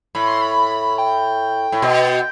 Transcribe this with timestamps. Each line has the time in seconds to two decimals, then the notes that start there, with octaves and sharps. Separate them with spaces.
0.15 A2 B5
0.28 C6
0.42 B5
0.98 G5
1.72 A2
1.82 B2